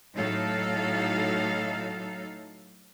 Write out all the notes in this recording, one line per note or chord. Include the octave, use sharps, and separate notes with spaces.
A2 F#3 D#4 A4 F5